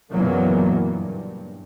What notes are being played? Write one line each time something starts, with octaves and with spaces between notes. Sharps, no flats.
F#1 A#2 E3 F#3 A#3 B3
G2